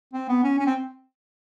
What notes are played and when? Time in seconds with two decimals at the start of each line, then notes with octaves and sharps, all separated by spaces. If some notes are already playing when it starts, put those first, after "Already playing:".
0.14 C4
0.29 B3
0.43 C#4
0.59 C#4
0.66 C4